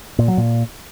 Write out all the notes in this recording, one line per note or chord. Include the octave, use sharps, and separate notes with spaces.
A#2
F#3
A#2